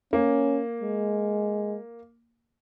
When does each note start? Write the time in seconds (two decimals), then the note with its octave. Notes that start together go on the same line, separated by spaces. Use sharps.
0.13 A#3 C#4
0.82 G#3